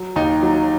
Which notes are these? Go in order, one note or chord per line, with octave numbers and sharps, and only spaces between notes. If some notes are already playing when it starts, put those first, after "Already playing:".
Already playing: F#3
D#2 D#4
F#3